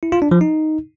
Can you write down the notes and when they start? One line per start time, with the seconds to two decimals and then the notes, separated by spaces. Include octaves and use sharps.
0.03 E4
0.12 F4
0.22 D4
0.31 F3
0.41 D#4